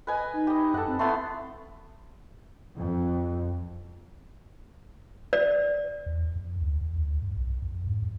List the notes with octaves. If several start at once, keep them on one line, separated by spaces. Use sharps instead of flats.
B4 D#5 G#5 B5
D#4
G4 D#5
F#2 A4 F#5
C4
A3 B3 E4 C6
F2
D5
E2
F2
D2
E2
D2
G2
B1
F2
G#2
F2